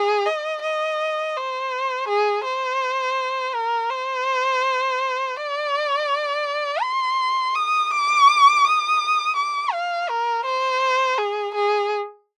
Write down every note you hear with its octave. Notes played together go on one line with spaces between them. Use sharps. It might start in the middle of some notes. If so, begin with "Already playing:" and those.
Already playing: G#4
D#5
D#5
C5
G#4
C5
A#4
C5
D5
C6
D#6
D6
D#6
D6
F5
A#4
C5
G#4
G#4